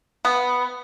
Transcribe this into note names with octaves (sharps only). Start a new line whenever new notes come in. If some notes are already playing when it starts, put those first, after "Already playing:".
B3